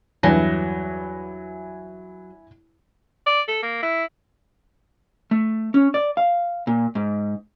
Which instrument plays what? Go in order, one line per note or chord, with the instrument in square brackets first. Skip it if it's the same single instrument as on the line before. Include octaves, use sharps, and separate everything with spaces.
[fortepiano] E2 G2 [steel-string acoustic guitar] F#3 [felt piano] E4 G#5 A#6
[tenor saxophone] D5
A4
A#3
E4
[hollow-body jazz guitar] A3
C#4
D5
F5
A#2
G#2